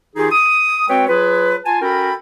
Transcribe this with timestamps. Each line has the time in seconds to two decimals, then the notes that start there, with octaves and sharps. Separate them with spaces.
0.16 D#3 D#4 F4 G4 G#4
0.32 D#6
0.89 G#3 C4 F#4 B4 C#5 G5
1.08 F#3 F4 G#4 B4
1.66 F4 G#5 A5
1.81 C#4 F#4 A4 A#4 G5 B5